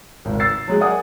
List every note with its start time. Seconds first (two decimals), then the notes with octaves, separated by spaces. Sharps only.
0.25 G#1 C#2
0.40 E6 A6 C7
0.68 F#3 G#3 G#4
0.81 A#4 D5 E5 F#5 G#5 D#6